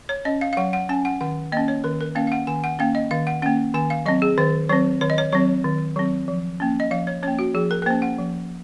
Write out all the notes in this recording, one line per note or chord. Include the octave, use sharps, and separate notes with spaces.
C#5
C#4 D#5
F5
F5
F#3 F#5
F#5
C#4 G#5
F#5
D#3 F#5
A#3 C#4 D#5
C#5
D#3 A#4
A#4
A#3 C#4 F5
F5
F#5
D#3 G#5
F#5
A#3 C#4 F5
D#5
D#3 F5
F#5
A#3 C#4 F#5
D#3 G#5
F5
F#3 C4 D#5
G#4
D#3 C5
F#3 C4 C5
D#3 C#5
D#5
C#5
F#3 C4 C#5
D#3
F#3 C4
F3
A#3 C#4
D#5
F3 F5
C#5
A#3 C#4 C#5
F#4
F3 G#4
A#4
A#4
A#3 C#4 C5
F#5
F3